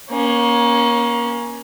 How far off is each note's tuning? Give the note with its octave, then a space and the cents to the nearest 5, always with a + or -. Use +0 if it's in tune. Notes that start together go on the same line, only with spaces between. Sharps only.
A#3 +30 C#4 +0